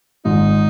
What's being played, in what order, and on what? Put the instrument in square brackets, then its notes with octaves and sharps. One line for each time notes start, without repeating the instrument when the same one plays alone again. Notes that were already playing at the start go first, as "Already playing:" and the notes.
[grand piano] G#1 G#2 G#3 F4 [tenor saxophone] D#4